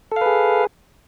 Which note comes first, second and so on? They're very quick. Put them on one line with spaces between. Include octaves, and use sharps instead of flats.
A4 F5 B4 G#4